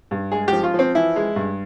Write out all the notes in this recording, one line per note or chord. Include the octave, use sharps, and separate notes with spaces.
G2
G#3 G#4
F3 G4
F4
F3 C4
E3 E4
G#3
G2